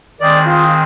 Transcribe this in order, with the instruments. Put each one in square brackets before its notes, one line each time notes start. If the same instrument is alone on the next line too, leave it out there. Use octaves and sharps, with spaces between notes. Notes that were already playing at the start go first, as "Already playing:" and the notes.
[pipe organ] D#3 G#3 C4 [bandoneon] D5
[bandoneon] F4